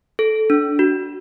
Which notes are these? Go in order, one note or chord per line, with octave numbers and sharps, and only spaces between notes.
A4
D4
F#4